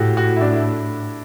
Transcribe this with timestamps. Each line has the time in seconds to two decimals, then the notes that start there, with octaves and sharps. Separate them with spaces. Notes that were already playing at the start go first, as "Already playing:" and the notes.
Already playing: A2 F#4 G4 A4
0.17 F#4
0.36 E4
0.41 D4
0.53 E4